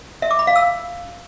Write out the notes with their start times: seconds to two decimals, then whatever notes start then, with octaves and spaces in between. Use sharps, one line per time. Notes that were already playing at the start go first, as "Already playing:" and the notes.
0.22 E5
0.31 D6
0.39 B5
0.47 F5
0.56 E6